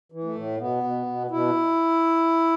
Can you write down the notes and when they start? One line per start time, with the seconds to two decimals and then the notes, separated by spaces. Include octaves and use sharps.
0.12 E3
0.24 A3
0.35 A2
0.59 B2 B3
0.84 B2
1.06 B2
1.30 B2 E4